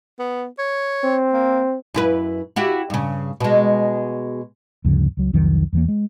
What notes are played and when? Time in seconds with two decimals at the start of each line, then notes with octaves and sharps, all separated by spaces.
0.20 B3
0.58 C#5
1.04 C4
1.33 A#3
1.94 F#2 E4 B4
2.56 E4 F#4 G4
2.90 G2 C#3
3.40 B2 G#3
4.84 D2 G2 C#3 F3
5.17 C#2 F#3
5.33 C2 F2 D#3 F#3
5.73 E2 E3 A#3
5.88 G#3